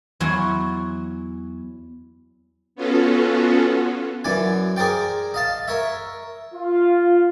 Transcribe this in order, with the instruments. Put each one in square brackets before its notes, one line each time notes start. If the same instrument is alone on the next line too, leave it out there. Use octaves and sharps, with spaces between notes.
[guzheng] E2 F#3 E4 C#5 C6
[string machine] B3 C#4 F4 F#4 A4
[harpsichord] F#2 E3 D5 G#5
G#4 A#4 C5 D5 G5
D#5 F5 A5
A#4 C#5 E5
[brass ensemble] F4